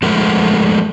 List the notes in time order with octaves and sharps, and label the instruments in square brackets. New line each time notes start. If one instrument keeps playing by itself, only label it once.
[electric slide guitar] F3 G#3 A3 A#4 F#5